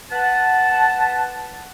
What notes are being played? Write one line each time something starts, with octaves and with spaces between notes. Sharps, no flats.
B4 F#5 A5